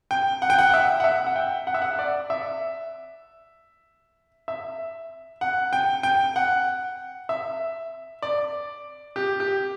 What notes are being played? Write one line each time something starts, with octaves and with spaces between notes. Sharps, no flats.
G5
F#5
G5
F#5
E5
F#5
E5
F#5
G5
F#5
E5
F#5
D5
E5
E5
F#5
G5
G5
F#5
E5
D5
G4
G4